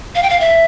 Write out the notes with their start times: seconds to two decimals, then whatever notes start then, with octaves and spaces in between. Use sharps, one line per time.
0.15 F5
0.23 G5
0.30 F5
0.40 E5